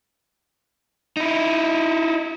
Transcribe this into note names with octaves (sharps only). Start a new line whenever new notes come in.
D#4 E4